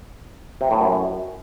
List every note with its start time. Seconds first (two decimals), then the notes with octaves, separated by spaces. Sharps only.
0.61 C3
0.71 A2
0.81 F#2